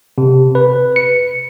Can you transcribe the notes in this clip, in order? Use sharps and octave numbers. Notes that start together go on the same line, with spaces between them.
C3
B4
C#7